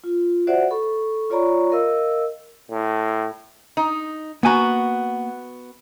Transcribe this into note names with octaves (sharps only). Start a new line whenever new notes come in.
F4
F#4 C5 D5 E5 F#5
A4 B5 C#6
F4 C#5 D5 A#5 B5 C#6
A#4 D#5 F5 E6
A2
D#4
A#3 B3 F#4 G#5 A#5